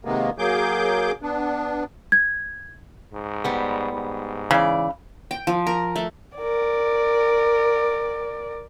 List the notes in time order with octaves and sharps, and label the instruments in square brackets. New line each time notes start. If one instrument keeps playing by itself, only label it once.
[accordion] C3 D#3 G#3 A#3 B3
F#3 A#3 G#4 D6 G6
B3 D4
[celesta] G#6
[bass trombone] G#2
[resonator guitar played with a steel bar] G3 B3
[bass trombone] G#2
[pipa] C#3 [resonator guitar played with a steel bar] E3 D5
[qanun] G5
F3
A#4
A3
[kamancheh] A#4 D5